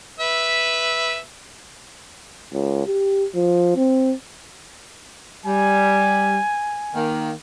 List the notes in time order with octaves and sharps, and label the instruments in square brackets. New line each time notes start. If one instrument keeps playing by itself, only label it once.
[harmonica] B4 E5
[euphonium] C#2
G4
F3
C4
[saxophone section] G3 [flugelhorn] G#5
[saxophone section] D#3 A#3